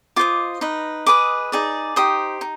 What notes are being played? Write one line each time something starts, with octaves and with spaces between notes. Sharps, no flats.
F4 C5 D#5 D6
D#4 B4 D#5
G#4 B4 D#5 D6
D#4 G#4 D5
D#4 G4 C5 D#6
D#4